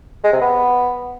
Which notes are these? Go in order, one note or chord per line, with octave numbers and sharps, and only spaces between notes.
G#3
C3
B3